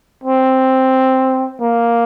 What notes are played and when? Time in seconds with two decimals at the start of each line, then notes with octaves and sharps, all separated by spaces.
0.24 C4
1.61 A#3